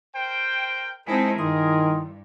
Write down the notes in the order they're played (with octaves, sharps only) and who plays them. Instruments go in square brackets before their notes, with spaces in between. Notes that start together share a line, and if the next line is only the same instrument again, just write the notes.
[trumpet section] A#4 C5 G5
[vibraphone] G#3 C5 A5 [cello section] C4 D#4 E4 [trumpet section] G#4 A#4
[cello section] G2 [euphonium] D#3 [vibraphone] E4 C6 D#6